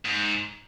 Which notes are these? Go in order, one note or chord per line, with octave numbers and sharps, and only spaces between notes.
G#2